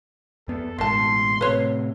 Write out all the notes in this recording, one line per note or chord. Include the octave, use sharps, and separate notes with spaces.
F2 B3 A4
A1 G#2 B2 D#3 A5 C6
A2 C3 B4 C#5